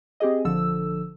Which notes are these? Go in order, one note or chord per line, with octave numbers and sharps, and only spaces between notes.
C4 G4 G#4 D#5
A#1 D3 F3 A4 E6